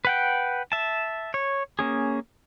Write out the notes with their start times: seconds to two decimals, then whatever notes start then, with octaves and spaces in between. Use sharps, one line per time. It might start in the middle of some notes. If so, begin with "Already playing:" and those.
0.05 B4 F#5 G5
0.72 E5 A5
1.34 C#5
1.79 A#3 C#4 G#4